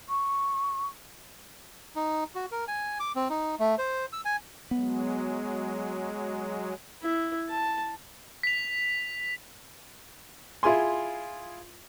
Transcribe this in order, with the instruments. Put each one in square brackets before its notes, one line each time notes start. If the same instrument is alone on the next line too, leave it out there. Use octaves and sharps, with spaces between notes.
[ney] C#6
[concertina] D#4
F#4
A#4
G#5
D6
C4
D#4
A3
C5
E6
G#5
[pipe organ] F#3 G#3 [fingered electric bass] B3
[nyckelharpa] E4
A5
[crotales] B6 F7
[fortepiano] E4 F4 G#4 G#5 C6